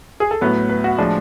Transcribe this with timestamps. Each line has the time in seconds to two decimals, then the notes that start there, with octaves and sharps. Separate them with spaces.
0.20 G#4
0.31 A4
0.41 A2 F#3 B3 B4
0.70 B4
0.84 F#4
0.98 A2 F3 G#3 D4